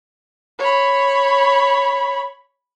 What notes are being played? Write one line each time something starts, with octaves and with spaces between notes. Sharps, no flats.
C#5 B5